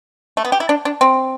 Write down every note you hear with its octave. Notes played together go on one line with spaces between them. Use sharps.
A3
B3
G4
E4
D4
D4
C4